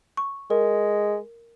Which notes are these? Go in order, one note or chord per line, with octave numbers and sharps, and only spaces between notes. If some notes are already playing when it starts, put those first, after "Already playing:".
C#6
G#3 A#4